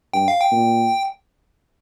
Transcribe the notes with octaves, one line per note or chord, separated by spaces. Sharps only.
G2 G5
F5
G5
A#2